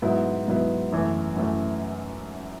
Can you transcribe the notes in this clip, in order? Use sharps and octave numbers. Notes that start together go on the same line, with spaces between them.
G#2 F#3 B3 E4
G#2 F#3 B3 E4
F#2 E3 A3
F#2 E3 A3